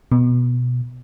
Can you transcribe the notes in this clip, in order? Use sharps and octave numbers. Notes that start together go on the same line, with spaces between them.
B2